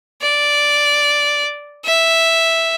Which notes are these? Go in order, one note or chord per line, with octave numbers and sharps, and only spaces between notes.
D5
E5